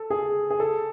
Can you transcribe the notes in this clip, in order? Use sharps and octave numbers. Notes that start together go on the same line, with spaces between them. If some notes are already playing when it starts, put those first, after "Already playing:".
Already playing: A4
G#4
G#4
A4